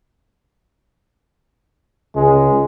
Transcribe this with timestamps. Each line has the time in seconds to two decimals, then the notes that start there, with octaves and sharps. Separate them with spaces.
2.16 C#2 G#3